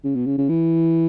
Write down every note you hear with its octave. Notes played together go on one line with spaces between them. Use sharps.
C#3
B2
C#3
C#3
E3